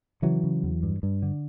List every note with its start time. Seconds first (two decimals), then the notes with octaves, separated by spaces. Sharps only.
0.22 C#3 E3 F#3
0.44 C#3
0.63 E2
0.83 G2
1.03 G2
1.22 D3